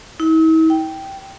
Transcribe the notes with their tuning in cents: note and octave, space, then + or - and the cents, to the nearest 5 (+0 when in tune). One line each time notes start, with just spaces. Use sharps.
E4 -45
G5 -5